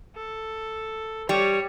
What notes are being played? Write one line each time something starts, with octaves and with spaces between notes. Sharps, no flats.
A4
G3 C#5